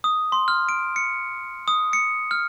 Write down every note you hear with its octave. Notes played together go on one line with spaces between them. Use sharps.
D#6
C6
F6
D7
C#7
D#6
C#7
F6